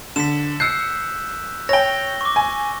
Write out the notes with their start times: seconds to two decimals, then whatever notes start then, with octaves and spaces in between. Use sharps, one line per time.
0.16 D3 B6 E7
0.60 E6 F#6 G6 C7 C#7
1.69 C#5 G5 A#6 G7
2.21 C#6 D6
2.36 G#5